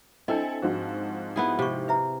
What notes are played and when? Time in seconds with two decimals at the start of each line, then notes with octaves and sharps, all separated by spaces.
0.28 C4 D4 E4 A4 D#5 G#5
0.62 G#2 F3 F#4
1.36 B3 E4 G#4
1.59 C3 F5 C#6
1.88 B4 E5 A#5